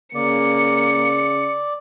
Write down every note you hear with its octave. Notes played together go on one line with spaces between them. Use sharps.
C#3 A#3 D5 C#7